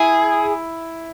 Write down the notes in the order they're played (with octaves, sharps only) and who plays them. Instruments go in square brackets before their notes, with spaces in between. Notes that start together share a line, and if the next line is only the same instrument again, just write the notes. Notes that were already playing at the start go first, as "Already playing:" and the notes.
Already playing: [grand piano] E4 [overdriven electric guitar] G#4